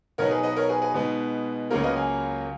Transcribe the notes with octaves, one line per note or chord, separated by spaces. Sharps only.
B2 F#3 B3 D#4 A#4 C#5
G#4 B4
B4 D#5
A#4 C#5
G#4 B4
G#4 B4
B2 G#3 B3 D#4
C#2 C#3 F#3 A#3 F4 A#4 C#5
B4 D#5
F5 G#5